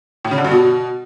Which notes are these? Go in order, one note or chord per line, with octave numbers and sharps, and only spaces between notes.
A2
C#3
D3
G2
B2